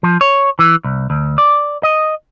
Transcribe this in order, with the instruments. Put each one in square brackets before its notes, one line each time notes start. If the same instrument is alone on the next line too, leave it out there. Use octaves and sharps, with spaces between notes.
[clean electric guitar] F3
C#5
E3
C2
D2
D5
D#5